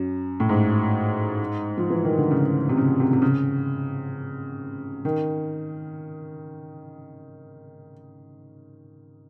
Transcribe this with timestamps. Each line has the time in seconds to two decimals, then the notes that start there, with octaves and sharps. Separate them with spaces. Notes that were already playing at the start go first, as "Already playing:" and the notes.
Already playing: F#2
0.40 A2
0.49 G#2
1.78 F3
1.90 E3
2.04 D#3
2.18 D3
2.31 C#3
2.69 C3
2.77 C#3
3.00 C3
3.13 C3
3.22 C#3
5.05 D#3